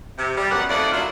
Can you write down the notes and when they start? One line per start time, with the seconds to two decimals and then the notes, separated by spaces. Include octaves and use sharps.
0.18 C3
0.37 G3
0.52 F#2 B3 F#5
0.69 F2 D#3 A3 A#3 D5 F#5
0.92 A#2 F#3 D4 E4 F4